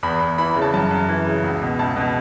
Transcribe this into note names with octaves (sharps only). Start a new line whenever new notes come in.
E2 B5
E2
E3 B5
B5
C#3
A5
F#2 A5
F#2
E3
C#3
C#2
B2
C#2 A5
B2